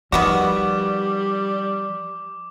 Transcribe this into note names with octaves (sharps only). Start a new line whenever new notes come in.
D#3 F3 G3 B3 F#4 D6